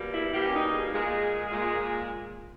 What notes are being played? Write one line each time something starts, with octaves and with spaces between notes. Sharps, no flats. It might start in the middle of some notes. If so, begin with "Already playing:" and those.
Already playing: B2 G3 A#3
E4
B2 G3 A#3 G4
C#4
D#4
G#4
A#2 G#3
A#2 G#3